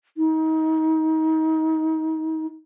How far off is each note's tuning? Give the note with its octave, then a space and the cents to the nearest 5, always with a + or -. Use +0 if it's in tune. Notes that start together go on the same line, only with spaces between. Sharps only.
D#4 +30